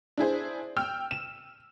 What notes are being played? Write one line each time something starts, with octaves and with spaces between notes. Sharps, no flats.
D4 E4 G#4 C5
G5 E6 F6
E7